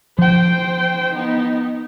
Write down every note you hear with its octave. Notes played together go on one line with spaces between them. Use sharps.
F3 C5 G5
B3 D#4